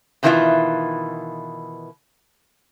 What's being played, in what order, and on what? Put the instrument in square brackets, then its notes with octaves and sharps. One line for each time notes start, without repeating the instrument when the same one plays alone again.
[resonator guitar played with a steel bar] B2 D#3 E3 G3 E4 F4